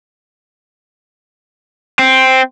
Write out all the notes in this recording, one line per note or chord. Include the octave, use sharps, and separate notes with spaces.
C4